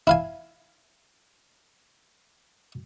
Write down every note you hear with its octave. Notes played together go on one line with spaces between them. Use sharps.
E4 F5 G#5